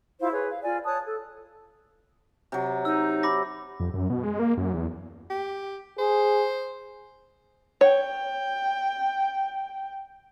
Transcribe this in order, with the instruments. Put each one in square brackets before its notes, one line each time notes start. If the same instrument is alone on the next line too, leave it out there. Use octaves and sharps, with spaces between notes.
[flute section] E4 F4 C5 F5
G#4 B4 C#5
F5
F4 D5 G#5
C#5 A5 D#6 F#6
A4
[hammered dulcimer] C3 F#3
[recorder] D#4 [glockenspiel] E6
[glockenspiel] B5 D6 A#6
[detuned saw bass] F2
F#2
B2
G#3
A#3
F#2
E2
[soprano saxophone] G4
[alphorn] G#4 [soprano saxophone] C5
[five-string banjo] C#5 [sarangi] G5